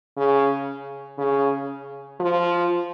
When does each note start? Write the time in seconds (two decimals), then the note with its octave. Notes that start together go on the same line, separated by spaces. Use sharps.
0.17 C#3
1.18 C#3
2.20 F3